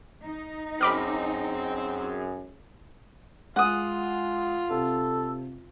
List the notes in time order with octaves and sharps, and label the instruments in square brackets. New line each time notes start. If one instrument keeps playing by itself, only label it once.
[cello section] D#4
[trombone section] F#2 G#4 [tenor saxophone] C4 [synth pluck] B5 D6 F6
[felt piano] G#3 [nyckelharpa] F4 [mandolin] F#5 D#6
[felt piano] C3 [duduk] A4